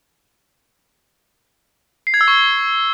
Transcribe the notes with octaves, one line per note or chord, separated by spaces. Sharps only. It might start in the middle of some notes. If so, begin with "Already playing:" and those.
C7
G#6
E6
C#6